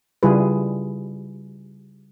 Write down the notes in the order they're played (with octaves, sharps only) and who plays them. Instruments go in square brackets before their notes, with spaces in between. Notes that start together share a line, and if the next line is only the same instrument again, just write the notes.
[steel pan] C#3 G3 E4 F4 G#4 B4